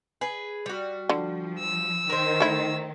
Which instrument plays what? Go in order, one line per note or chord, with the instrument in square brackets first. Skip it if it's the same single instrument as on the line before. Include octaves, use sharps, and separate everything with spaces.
[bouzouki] G#4 B4
G3 F#4
[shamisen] D3 [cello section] F3
[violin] E6
[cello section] D#3 [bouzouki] A#4 C5
[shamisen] A3 E4